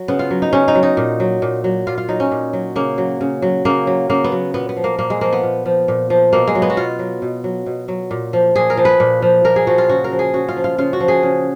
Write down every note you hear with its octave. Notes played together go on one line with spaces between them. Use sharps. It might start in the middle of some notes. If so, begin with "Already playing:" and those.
Already playing: F#3
C#3 B3
F4
F#3
D#4
C#3 C#4
D#4
F#3
D#4
A#2
F#3
A#2
F#3
A#2 F4
F4
F#3 D#4
C#4
A#2
F#3
C#3 A#3
F#3
C#3
F#3
C#3 A#3
F#3
C#3 A#3
B3
F#3
A#2 B3
B3
F3
A#3
A#2 A#3
G#3
F3 A#3
B3
A#2
F3
A#2
F3
B2 A#3
G#3
F#3
B3
F#4
B2 F4
F#3
B2
F#3
B2
F#3
A#2
F3
A#2 G#4
A#4
F3
B4
A#2
F3
A#2 A#4
G#4
F3 F#4
F4
C#3 F#4
A#4
F3
G#4
C#3 F#4
F4
F3
F4
C#3 F4
F#4
F3
G#4
C#3